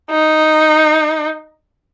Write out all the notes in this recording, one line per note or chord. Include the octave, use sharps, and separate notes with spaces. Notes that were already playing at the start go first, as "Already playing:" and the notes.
D#4